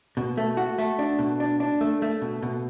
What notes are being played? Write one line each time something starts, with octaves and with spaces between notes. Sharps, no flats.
B2
A3
F#4
A3
D4
B2
D4
D4
A3
A3
B2
B2